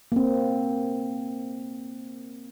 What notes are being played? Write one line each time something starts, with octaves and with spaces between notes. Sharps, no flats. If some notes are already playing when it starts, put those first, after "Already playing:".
A#3 C4